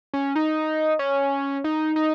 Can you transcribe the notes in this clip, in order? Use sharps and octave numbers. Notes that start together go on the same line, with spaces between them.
C#4
D#4
C#4
D#4
D#4